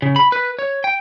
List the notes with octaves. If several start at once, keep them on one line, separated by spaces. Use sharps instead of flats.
C#3
B5
B4
C#5
G5